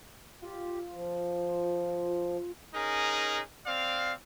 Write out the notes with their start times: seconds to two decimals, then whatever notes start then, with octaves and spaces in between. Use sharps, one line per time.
0.42 F4 G4
0.91 F3
2.74 C#4 D#4 G#4 A#4
3.66 C4 D5 F5